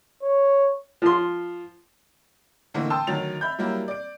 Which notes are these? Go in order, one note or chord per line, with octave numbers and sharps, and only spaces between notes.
C#5
F3 C6
D3 E3 A3 A#3 C4 D#4
G5 A5 C6 D#6 E6
D2 D#3 F#3 A6 F7
E5 B5 G6
F#3 G3 A#3 E4
D5 D7